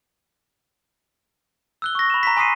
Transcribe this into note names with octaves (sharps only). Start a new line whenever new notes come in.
E6 F#6 G7
C#6 A#6
B5 E7
A#5 B6
G#5 C6 D#6 B6 C7 D#7